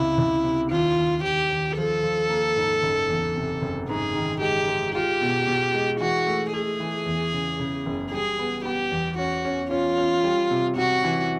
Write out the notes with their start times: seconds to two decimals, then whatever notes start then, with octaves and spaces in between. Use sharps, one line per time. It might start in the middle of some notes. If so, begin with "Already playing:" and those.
Already playing: C#2 C3 E4
0.18 C#2
0.44 C3
0.71 D#2 F4
0.98 D#2
1.24 D#2 G4
1.50 D#2
1.77 F3 A4
2.03 F3
2.30 A#3
2.56 G#2
2.83 F#1
3.09 E2
3.35 C3
3.62 F#1
3.89 G#2 G#4
4.15 D#3
4.41 G#3 G4
4.68 G#3
4.95 F4 G4
5.22 B2
5.47 B2
5.74 G#3
6.00 E3 F#4
6.27 A3
6.53 A3 G#4
6.80 E3
7.06 E2
7.33 C#3
7.60 C#3
7.86 F#1
8.12 G3 G#4
8.39 B3
8.65 B3 G4
8.91 E2
9.18 C#4 F#4
9.45 C#4
9.71 C#4 F4
9.98 C#4
10.24 G3
10.51 C3
10.76 C3 F#4
11.04 E3